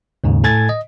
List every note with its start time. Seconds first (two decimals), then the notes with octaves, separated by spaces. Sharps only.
0.24 D#2 G#2 C#3
0.44 A2 A4 G#5 G#6 A6
0.69 D#5